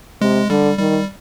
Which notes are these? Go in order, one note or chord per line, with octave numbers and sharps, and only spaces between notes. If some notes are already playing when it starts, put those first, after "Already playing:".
C3 G#3
D3 G3
D#3 G3